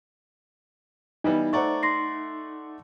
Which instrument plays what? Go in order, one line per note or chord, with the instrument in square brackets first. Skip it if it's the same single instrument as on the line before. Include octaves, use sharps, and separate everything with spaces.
[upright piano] E3 G3 B3 [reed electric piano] D#4
[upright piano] A3 D5 F#5 [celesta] C5 A#5 C#6
[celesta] C6 A#6 C7